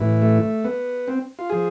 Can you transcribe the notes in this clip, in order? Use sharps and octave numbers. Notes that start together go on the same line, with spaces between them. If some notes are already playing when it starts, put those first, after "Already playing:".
Already playing: A2 E3
A3
B3
C4
F4
F3 G#4